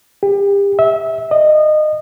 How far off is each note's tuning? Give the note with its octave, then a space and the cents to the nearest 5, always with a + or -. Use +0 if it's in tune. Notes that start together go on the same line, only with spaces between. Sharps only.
G4 +35
E5 -25
D#5 -25